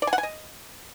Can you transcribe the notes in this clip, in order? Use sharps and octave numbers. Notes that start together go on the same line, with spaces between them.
D5
G#5
F#5
G#5
D#5